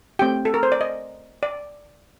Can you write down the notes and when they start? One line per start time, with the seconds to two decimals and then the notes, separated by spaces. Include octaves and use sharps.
0.19 A3 C4 G4 G5
0.45 A4
0.54 A#4
0.63 C5
0.72 D5
0.81 D#5
1.43 D5